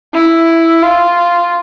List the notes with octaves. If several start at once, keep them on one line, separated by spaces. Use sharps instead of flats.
E4
F4